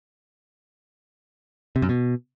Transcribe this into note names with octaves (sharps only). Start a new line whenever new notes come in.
C3
F#2
B2